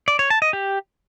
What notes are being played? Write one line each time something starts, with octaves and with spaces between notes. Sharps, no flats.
D5
C#5
A5
D#5
G4